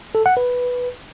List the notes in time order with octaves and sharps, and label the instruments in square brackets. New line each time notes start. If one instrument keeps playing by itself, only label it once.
[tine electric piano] A4
F#5
B4